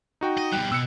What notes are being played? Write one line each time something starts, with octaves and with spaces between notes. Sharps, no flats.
D#4 F#4 G5
D#5
B2 G3 G5 F#6
B2 E6 F#6 C#7